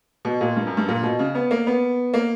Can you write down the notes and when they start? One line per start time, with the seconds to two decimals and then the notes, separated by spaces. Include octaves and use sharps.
0.25 B2
0.41 A#2
0.56 G2
0.67 F#2
0.77 G2
0.88 A#2
1.03 B2
1.19 C#3
1.35 B3
1.51 A#3
1.67 B3
2.14 A#3